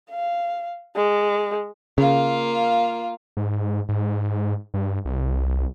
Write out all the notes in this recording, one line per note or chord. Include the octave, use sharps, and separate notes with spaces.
F5
G#3
C#3 A#3 F4
G#2
G#2
G2
C2